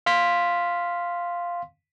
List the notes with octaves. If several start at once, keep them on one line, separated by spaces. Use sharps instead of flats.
F5 C6 B6